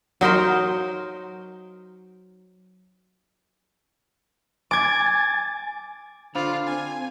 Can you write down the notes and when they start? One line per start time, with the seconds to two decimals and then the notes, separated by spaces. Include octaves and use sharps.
0.21 F#3 D#4 A#4 C5
4.71 G#5 D6 G#6 A6
6.35 D3 D4 F4 C5 F5 B5
6.67 C4 G#5